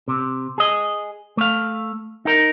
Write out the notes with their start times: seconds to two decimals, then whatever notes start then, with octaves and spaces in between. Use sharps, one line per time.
0.08 C3
0.58 G#4 D#5
1.37 A3 F5
2.25 D#4 A#4